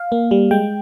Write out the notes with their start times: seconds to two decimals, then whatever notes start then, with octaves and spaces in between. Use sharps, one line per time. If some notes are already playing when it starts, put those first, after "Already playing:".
Already playing: F5
0.12 A#3
0.31 G3
0.51 G#3 G5